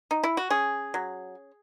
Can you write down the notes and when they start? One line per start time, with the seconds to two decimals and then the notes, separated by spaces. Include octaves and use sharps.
0.11 D#4
0.24 E4
0.37 F#4
0.50 C#4 G#4
0.94 F#3